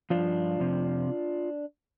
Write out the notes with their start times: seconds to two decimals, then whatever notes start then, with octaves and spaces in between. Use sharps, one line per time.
0.10 G2 F3 D4 F4
0.60 F2 C3 F3